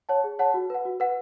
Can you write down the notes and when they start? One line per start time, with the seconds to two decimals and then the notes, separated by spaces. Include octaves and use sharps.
0.09 C#5 F#5 A5
0.24 G#4
0.39 C#5 F#5 A5
0.54 F#4
0.70 B4 F#5
0.85 F#4
1.00 B4 F#5